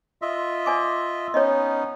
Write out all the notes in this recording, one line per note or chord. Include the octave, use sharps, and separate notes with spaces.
F4 D#5 E5
D5 G#5 D6
B3 C#4 D#4 C#5 D#5